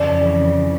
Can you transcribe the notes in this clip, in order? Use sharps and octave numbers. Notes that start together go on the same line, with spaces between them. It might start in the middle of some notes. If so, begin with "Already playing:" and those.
Already playing: F2 C#3 E3 D5